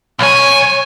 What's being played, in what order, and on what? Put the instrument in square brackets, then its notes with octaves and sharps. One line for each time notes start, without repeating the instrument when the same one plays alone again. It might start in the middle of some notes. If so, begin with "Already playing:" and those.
[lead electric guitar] B1 G#5 [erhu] C#5